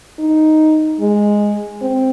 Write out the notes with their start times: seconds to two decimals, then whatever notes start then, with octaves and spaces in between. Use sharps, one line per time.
0.19 D#4
1.01 G#3
1.82 C4